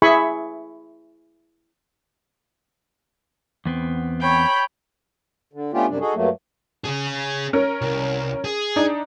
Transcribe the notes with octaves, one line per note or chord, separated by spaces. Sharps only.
E4 G#4 E5 G#5 B5 C#6
E2 B3 C4
C#5 G5 B5
D3
A3 B3 C#4 D4 F4 G4
F#2 C3 G3 D4
D#4 F#4 G#4 A4
G2 F#3 A3 A#3
C#4 G#4
C#4 A#4
C2
G#4
D4 D#4